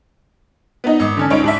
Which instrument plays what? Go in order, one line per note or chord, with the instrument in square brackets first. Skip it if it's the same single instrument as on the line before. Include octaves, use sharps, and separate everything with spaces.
[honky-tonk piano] B3 D#4
G#1
D3 C#4 D4
C#2 D#4 C#5 D7
G#2 D4 E5